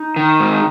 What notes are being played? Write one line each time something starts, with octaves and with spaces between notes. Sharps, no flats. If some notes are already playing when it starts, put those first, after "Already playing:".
Already playing: D#4
D#3
G#2